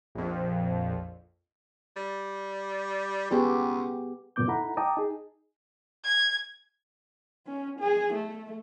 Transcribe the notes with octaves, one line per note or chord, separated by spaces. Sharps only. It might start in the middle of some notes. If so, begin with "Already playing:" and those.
A#1 F2
G3
C#2 B3 G4 G#4
F#2 A#2 C#3 B3 D6 G6
D#4 E4 A4 F#5 A#5 B5
D#5 G5 A5 A#5 D6 D#6
D#4 G#4
G#6
C#4
G#4
A3